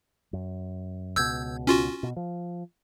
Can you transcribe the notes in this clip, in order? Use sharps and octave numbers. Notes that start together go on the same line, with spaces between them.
F#2
C#2 B2 E6 G6 G#6
C#4 F4 F#4
B2
F3